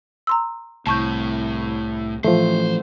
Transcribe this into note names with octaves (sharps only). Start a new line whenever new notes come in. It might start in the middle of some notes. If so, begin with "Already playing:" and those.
A#5 C6 E6
C2 A2 A5 C#6 G6
A2 E3 F3 A3 C5